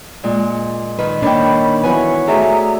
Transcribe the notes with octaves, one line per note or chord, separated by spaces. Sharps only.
A#2 G#3 D5
D#3 B4
D#3 A#3 D4 C#5 G5 B5
E3 B3 F#4 B4 C#5 G#5
A3 F#4 G#4 D5 E5 A#5 D#6